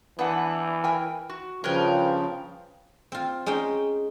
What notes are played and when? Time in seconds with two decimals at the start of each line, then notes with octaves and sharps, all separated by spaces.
0.19 E3 B3 D4 B4 F#5
0.84 A#4 G5 G#5
1.29 F#4
1.64 G2 C#3 F3 A#4 B4 C#5 G5
3.12 C4 F4
3.46 G#3 C#4 D#4 G5